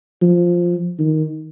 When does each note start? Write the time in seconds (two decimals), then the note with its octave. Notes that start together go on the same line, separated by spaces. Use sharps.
0.22 F3
0.99 D#3